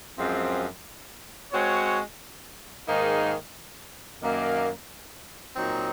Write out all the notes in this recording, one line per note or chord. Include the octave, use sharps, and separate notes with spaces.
F#2 F3 G#3 C4
G#3 C4 F#4 C#5
G#2 D#3 A#3 D#4 G#4
F#2 D#3 A#3
A#2 F#3 C4 D#4